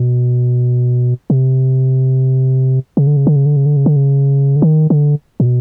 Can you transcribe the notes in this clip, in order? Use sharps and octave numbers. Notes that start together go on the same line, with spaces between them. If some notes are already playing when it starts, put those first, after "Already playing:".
Already playing: B2
C3
C#3
D3
C#3
D3
C#3
D3
C#3
D3
C#3
D3
C#3
D3
D#3
D3
A#2
B2